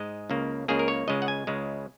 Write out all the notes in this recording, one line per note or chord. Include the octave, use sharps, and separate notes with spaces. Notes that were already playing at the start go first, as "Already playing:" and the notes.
Already playing: G#2 G#3 D#5
C#2 C#3 A#3
C#2 C#3 A#3 G#4
A#4
C#5
C#2 C#3 G#3 D#5
F#5
G#5
C#2 C#3 G#3